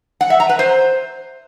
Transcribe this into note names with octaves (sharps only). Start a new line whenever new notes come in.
F#5
E5
A#5
B4
C5